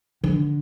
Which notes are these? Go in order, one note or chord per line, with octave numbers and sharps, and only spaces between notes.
D3